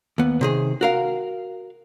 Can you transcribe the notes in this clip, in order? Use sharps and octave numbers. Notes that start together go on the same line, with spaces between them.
D#2 B3
C3 D#3 G#4
F#4 A#4 F5